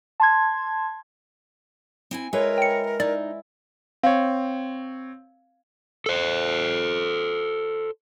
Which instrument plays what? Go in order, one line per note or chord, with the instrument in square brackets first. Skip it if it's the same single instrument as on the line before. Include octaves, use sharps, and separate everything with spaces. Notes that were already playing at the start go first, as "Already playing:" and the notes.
[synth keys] A5 C6 G#6
[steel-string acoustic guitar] C4 E4 G#5
[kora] G#3 E4 B4 [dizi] A#4 [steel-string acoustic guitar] C#5
[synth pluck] G5 C#7
[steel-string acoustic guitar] D#4 [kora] E4 [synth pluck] D5
[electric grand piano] C4 C#5 [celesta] F5
[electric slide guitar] A4 C5